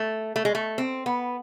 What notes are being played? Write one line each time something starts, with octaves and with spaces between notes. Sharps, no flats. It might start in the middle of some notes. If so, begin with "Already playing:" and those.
Already playing: A3
A3
G#3
A3
C4
B3